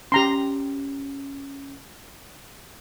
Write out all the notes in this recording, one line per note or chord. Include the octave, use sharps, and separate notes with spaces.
C#4 G4 A#5 C6